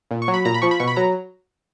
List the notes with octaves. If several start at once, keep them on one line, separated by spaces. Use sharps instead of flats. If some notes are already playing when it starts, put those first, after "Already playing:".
A#2
C#6
F#3
B5
A#2 A#5
B5
F3 C#6
B5
B2 C#6
B5
F#3 A#5